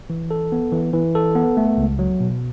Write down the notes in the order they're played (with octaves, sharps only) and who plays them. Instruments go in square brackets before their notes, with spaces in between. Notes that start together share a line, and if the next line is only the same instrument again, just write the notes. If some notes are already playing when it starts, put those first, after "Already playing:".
[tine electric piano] E3
A4
B3
E3
E3
A4
B3
A3
C#2
F#3
B2